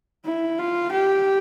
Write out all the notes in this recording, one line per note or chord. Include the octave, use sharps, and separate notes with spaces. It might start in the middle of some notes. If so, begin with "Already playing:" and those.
E4
F4
G4